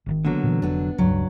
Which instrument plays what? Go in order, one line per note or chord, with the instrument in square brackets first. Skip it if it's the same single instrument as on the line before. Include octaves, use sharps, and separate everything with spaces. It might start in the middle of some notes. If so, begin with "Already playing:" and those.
[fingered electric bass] G#1 C3 D#3
[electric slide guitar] D3 F#3 [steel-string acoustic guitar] A#3 B3
[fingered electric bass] A#2 E3
[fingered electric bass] F1 [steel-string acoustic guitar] B3 D4
[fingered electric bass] E1 C#2 D4 [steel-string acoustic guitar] G2 F#3